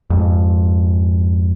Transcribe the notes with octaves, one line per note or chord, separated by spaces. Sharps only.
F2 G#2